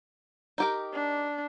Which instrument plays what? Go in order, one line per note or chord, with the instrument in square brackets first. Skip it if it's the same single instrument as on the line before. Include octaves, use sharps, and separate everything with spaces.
[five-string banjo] D#4 G4 A#4
[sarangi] D4